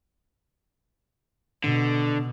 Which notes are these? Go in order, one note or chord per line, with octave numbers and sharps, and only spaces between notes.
B2 D3